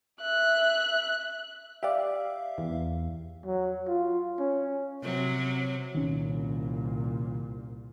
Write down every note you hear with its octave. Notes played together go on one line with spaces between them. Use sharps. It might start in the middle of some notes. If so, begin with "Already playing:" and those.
E5 F#6
G4 D5 E5 F5
E2
F#3
F4
C#4
C3 F#3
C2 A#2 D#3 C#4